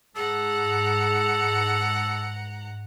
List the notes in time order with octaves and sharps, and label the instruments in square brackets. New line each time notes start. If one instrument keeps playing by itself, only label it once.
[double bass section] G#2 [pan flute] G#4 [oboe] A4 [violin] F#5 A#5